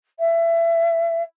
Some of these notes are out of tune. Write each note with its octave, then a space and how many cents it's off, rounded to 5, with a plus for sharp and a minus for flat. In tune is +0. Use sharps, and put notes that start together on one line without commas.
E5 +25